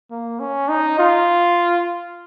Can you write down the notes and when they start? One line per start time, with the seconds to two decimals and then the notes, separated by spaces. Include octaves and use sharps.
0.11 A#3
0.40 C#4
0.69 D#4
0.98 F4